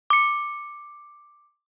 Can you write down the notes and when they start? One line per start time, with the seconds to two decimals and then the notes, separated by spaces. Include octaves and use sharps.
0.10 D6 C#7